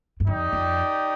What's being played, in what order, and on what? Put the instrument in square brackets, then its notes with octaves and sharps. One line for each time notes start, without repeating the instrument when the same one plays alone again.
[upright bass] G2
[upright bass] F2 [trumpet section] D#4 G4 D5 G5
[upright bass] F2